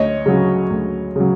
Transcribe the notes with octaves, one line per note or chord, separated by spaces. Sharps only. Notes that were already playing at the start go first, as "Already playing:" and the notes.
Already playing: D2 C#5 D#5
C#3 F#3
D2
C#3 F#3